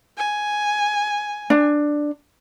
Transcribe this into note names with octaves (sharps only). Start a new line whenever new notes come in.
G#5
D4